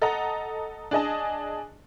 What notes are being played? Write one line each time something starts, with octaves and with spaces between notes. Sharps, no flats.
A4 D#5 F#5 A#5
D4 G#4 D#5 A5